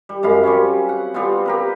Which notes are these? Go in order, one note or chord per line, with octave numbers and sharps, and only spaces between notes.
G3
F#2 G#3 F5 B5
G3 C4 C#4
F#5
G3 B3 C4 F4
G4 A#4 B4